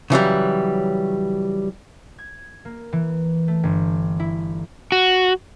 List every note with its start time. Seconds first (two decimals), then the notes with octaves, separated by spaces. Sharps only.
0.10 C#3 E3 F#3 G3
2.18 G#6
2.65 A#3
2.93 E3
3.48 A3
3.63 G1
4.20 E4
4.92 F#4